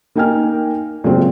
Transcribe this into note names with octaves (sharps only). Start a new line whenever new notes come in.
A#3 D#4 A#4 G5 G#5 F6
A#2 C#3 F#3 G#3 A3 C4